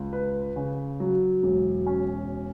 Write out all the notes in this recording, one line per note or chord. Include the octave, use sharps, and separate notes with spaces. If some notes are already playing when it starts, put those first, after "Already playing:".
Already playing: C#2
B4
C#3
F#3
E1
C#4